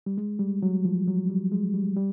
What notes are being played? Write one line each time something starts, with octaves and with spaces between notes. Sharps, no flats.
G3
G#3
G3
F#3
F3
F#3
G3
G#3
G3
G3